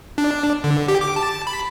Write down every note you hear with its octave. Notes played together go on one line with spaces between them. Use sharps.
D4
D3
G4
D6
A5
B5